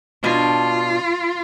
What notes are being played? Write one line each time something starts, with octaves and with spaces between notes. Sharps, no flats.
B2 D4 F4